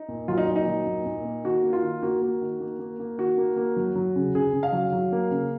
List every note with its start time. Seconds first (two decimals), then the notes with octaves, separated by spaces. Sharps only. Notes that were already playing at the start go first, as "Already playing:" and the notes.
Already playing: D#4
0.08 A#2
0.28 F#3 F4
0.38 D#4
0.48 A#2
0.56 D#4
0.68 F#3
0.87 A#2
1.06 A#2
1.25 A#3
1.44 D#3 F#4
1.63 A#3
1.73 F4
1.83 D#3
2.02 A#3 F#4
2.22 A#3
2.42 D#3
2.60 A#3
2.79 A#3
2.99 A#3
3.18 D#3 F#4
3.38 A#3
3.57 A#3
3.76 F#3
3.95 F#3
4.16 C#3
4.35 C#3 G#4
4.53 C#3
4.63 F5
4.73 F#3
4.92 F#3
5.12 A#3
5.31 C#3